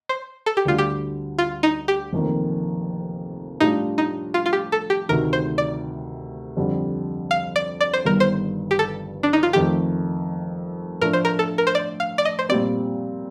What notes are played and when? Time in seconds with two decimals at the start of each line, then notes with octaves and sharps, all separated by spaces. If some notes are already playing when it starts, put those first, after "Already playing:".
0.09 C5
0.46 A4
0.57 G4
0.65 D2 D3 G3 F4
0.78 G4
1.39 F4
1.63 D#4
1.88 G4
2.13 F1 F2 D#3 A#3
3.61 A2 G3 D4 D#4 F4
3.98 D#4
4.34 F4
4.46 F4
4.53 G4
4.72 A4
4.90 G4
5.08 D2 C3 D#3 A3 D#4 A#4
5.33 C5
5.58 D5
6.57 F2 D3 G3
7.31 F5
7.56 D5
7.81 D5
7.94 C5
8.05 G1 G2 D#3 A#4
8.20 C5
8.71 G4
8.79 A4
9.23 D4
9.33 D#4
9.43 F4
9.53 F2 D#3 A3 G4
11.01 A2 F3 A3 D4 A#4
11.13 C5
11.25 A#4
11.39 A4
11.58 A#4
11.67 C5
11.75 D5
12.00 F5
12.18 D5
12.25 D#5
12.39 C5
12.49 A#2 G3 C4 D5